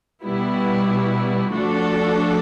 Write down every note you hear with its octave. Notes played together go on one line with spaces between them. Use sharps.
B2 G3 B3 E4
F3 A3 D4 F#4 A4